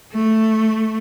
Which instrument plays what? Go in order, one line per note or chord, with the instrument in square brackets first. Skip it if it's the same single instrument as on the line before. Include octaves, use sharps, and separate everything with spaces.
[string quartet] A3